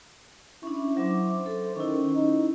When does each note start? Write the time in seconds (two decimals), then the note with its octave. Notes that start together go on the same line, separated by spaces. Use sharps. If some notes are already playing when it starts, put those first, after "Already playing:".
0.63 C#4 D4 E4
0.97 F#3 C5 E5 D6
1.46 A4
1.76 D#3 C#4 E4
2.13 D#4